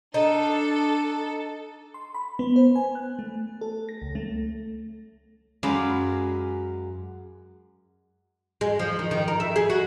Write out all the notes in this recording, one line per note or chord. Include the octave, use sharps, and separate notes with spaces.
D4 D#4 A4
C6
B5
B3
C5
G#5
F#6
A3
A4
A#6
C#2
A3
F#2 G#3 D5 F5 B5
G#3
F3
D#3
D#3
A#4
E5
G#4
F#4